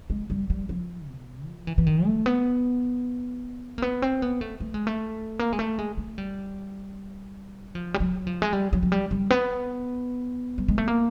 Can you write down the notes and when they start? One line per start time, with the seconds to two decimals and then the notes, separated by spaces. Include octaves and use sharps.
0.10 G#3
0.30 G3
0.50 G3
0.69 F3
1.08 B2
1.47 F3
1.67 E3
1.78 E3
1.87 D#3
2.06 A3
2.26 B3
3.78 A#3
3.82 B3
4.02 C4
4.22 B3
4.41 A3
4.60 A3
4.74 G#3
4.87 A3
5.39 A#3
5.53 G#3
5.59 A3
5.79 G#3
5.97 A3
6.18 G3
7.75 F3
7.94 G3
8.00 F#3
8.27 F3
8.42 G#3
8.53 G3
8.73 F#3
8.83 F#3
8.92 G3
9.11 G3
9.30 B3
10.58 G3
10.68 G#3
10.78 A3
10.88 A#3